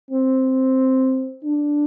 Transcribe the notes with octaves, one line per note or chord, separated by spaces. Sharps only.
C4
D4